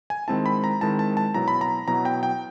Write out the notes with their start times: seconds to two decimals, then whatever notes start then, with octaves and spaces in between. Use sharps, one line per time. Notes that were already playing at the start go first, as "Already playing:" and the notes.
0.10 G#5
0.28 D#3 G#3 C4 E4 A5
0.46 B5
0.64 A#5
0.81 D#3 G#3 C4 E4 A5
0.99 A5
1.17 A5
1.34 B2 F#3 B3 E4 A#5
1.48 B5
1.61 A#5
1.88 B2 F#3 B3 E4 A#5
2.05 G5
2.23 G5